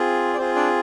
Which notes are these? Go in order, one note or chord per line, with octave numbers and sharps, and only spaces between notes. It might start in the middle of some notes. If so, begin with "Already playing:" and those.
Already playing: C4 F4 G#4
D5
C4 F4 G#4 C5
D4 D5